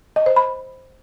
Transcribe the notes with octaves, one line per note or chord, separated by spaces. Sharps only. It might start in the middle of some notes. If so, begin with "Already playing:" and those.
D#5
C5
B5